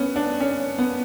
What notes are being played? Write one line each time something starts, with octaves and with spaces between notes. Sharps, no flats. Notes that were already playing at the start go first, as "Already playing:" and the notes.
Already playing: B3 C#4
D4
C#4
B3